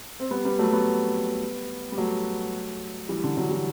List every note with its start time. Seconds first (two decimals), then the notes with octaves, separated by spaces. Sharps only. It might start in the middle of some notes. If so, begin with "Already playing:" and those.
0.20 C4
0.31 G3 B3
0.45 G3 B3
0.59 F#3 A3
0.73 G3 B3
1.92 G3
1.98 F#3 A3
3.09 E3 G3
3.24 D3
3.37 D3 F#3
3.51 E3 G3